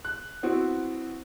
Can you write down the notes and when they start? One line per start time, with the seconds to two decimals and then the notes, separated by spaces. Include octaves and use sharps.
0.05 F#6
0.43 B3 C4 E4 F#4